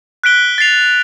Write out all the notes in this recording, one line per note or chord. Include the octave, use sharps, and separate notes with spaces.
F#6 B6 D7 G7
A6 C7 F7